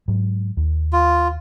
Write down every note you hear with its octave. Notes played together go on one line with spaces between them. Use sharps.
G#2 F#3
D#2
F4